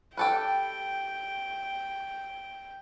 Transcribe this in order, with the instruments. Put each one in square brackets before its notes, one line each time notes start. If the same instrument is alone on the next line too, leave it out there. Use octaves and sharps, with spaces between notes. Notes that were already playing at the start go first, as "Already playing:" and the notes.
[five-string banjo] G4 A4 B4 [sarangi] G5